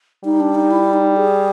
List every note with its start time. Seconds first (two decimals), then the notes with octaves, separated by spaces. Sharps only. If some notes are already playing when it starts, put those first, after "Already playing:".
0.24 G3 D#4
0.40 D4
0.55 D#4
0.71 E4
0.93 D#4
1.16 G#4